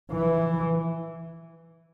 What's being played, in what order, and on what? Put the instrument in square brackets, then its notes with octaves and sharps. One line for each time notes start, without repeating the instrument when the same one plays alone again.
[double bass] E3